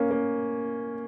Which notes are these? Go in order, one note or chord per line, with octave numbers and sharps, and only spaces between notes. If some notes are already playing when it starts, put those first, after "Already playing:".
Already playing: A#3 C#4
A#3